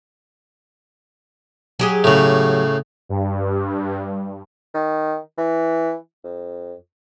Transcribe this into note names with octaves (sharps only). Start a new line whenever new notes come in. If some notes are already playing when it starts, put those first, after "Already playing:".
F#3 G4 G#4
A2 C#3
G2
D#3
E3
F2